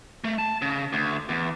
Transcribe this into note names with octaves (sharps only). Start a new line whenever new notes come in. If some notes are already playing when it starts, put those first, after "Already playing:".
A3
A5
C#3
D2
E2